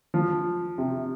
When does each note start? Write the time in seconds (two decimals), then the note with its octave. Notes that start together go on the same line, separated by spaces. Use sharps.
0.14 F3
0.78 C3